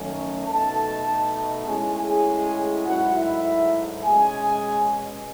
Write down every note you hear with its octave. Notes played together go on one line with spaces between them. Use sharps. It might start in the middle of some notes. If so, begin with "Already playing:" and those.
Already playing: F#2 D#3 A3 C#4
B2 A3 D#4 A4 A5
A2 G#3 C#4 E4 G#4 G#5
G#4 G#5
G#2 F#3 A3 E4 F#4 F#5
E4 E5
B2 G#3 C#4 G#4 G#5